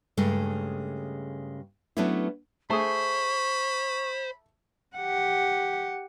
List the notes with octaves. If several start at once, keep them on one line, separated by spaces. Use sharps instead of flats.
G2 C#3 G#3 A3
F#3 A3 B3 C#4 D4 E4
A3 G#4 C5 B5 C#6
G4 F#5